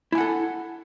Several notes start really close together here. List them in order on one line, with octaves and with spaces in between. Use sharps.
E4 G#5 F#5 A4